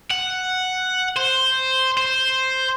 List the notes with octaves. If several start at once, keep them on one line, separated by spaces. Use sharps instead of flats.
F#5
C5
C5